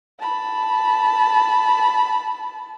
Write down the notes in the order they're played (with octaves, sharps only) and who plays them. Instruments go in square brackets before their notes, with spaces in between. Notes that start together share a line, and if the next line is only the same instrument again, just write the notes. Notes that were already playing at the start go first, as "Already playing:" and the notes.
[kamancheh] A5 B5